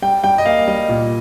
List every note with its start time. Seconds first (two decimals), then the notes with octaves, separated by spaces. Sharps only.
0.02 G3 G5
0.24 G3 G5
0.38 D#5
0.46 A#3 F5
0.68 G3 D#5
0.89 A#2